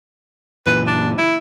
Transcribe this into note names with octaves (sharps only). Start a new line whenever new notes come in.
F#1 A#2 E3 B4
D4
E4